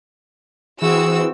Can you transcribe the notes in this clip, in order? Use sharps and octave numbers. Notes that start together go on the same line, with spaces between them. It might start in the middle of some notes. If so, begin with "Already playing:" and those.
E3 C4 F#4 G#4 E6